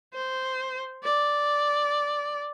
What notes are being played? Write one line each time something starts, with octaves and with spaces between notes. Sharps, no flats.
C5
D5